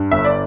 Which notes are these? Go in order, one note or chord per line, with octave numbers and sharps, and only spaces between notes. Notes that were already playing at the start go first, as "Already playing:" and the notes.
Already playing: G2
G1 E5
D5